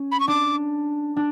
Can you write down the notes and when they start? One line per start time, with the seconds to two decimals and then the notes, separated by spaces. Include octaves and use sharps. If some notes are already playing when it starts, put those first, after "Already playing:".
Already playing: C#4
0.12 B5
0.20 C#6
0.28 D4 D6
1.16 D4